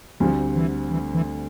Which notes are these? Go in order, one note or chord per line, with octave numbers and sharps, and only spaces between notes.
D2 D3 F3 G3 C4
E3
E3
E3